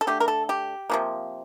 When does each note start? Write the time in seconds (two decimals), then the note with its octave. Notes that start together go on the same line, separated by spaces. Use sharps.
0.01 A4
0.07 D3 A3 G4
0.20 A#4
0.28 A4
0.49 G4
0.90 C3 F3 A#3